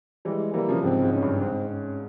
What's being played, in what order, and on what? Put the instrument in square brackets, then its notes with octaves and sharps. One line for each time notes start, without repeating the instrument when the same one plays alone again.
[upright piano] E3 G3 [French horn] G#3
[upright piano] E3 G3 [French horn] A#3
[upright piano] C#3 F3
[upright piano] G#2 C3 [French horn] C4
[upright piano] G#2
[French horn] C#4
[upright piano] G2
[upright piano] G#2 [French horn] C4
[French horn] C#4